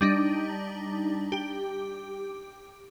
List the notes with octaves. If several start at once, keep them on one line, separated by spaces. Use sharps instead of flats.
G3 D4 D#4
G4